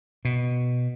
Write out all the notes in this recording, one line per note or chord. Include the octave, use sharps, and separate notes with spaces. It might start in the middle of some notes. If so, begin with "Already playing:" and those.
B2